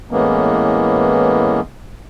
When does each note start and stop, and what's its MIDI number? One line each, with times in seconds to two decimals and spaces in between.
0.11 1.61 45
0.11 1.61 52
0.11 1.61 56
0.11 1.61 58
0.11 1.61 59
0.11 1.61 61